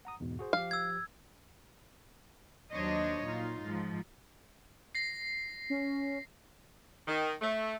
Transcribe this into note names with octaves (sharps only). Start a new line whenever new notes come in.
F#5 A#5 D#6
E2 G#2 B2
F#4 G#4 C5
F3 G4 F5
E6 G#6
D#2 F#3 D4 C5 C#5 D#5
A#2 D#4 F4
G#2 F3
A#6 C7
C#4
D#3
A3